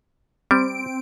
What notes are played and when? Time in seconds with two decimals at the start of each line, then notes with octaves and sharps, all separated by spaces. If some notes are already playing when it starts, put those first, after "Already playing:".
0.51 G3 C4 D7